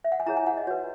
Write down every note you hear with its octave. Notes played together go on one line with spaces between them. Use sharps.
E5
F#5
G#5
E4 G#4 C#5 A#5
G#5
F#5
D#5
F#4 B4 C#5